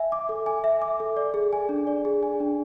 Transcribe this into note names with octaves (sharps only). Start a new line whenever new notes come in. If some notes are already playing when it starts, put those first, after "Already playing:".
Already playing: E5 G#5
D6
A4
G#5
E5
D6
A4
D5
G#4
G#5
D4
D5
G#4
G#5
D4